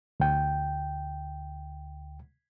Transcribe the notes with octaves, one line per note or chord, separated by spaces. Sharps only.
D2 G5